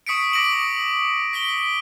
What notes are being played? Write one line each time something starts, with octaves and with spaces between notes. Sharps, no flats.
C#6 D#6 B6 C#7 D7
D6 D#6 A#6 D7 F#7
B6 D7 G7